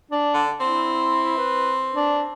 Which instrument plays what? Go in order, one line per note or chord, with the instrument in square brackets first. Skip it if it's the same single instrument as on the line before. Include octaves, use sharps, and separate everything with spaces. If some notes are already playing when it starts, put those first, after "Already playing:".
[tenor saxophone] D4
[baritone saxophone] D3
[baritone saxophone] C4 [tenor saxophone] E4
[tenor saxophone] B4
D4